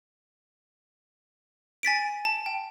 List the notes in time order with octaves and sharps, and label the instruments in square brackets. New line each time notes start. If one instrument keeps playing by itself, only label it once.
[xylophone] G#5 A6 B6 D7
A5
G5